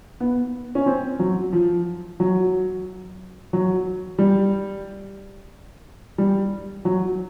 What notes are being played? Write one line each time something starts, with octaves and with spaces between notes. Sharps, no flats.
B3
C#4
C4
F#3
F3
F#3
F#3
G3
G3
F#3